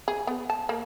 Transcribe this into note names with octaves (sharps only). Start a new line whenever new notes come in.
G#4
B3
A5
A#3